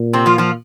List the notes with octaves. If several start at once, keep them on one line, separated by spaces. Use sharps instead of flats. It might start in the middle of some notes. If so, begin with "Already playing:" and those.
Already playing: A#2
C3 C4
F3 F4
F3 F4